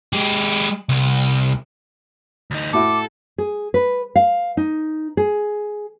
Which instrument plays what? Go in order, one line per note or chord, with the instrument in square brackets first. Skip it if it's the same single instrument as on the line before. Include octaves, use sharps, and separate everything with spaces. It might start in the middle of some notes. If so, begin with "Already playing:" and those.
[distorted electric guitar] G#3 G4
C2
[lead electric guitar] D2 D#4
[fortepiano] A2 E4 F#4 [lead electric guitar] A4 [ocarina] D6
[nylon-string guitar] G#4
B4
F5
D#4
G#4